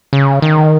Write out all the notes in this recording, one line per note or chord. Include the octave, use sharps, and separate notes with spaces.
C#3
D#3